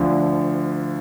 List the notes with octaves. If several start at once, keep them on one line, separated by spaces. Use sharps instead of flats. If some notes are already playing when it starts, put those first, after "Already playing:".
Already playing: D2 D3 F3